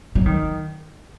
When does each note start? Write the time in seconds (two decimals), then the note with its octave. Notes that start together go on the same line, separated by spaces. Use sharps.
0.15 F#3
0.26 D#3